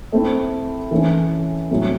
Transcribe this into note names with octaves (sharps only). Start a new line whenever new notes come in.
A3 C4 E4
E3 A3 C#4
A2 F#3 A3 C4